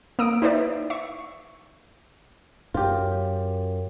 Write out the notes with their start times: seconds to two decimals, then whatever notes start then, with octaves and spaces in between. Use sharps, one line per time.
0.19 A#3 D#6 E6 D7
0.42 D#4 E4 B4 C5 D5 E5
0.90 E5 C#6
2.74 F#2 F4 G4